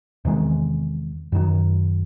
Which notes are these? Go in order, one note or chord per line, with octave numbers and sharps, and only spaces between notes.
E2 C3 D#3 G#3
F#2 D#3 F#3